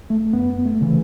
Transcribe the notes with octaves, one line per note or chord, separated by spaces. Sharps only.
A3
F#2 B3
A3
C#3 E3